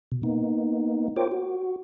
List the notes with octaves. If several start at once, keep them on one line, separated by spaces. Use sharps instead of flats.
B2
A#3 B3 D#4
F4 A#4 C5 C#5 G5 D6
F#4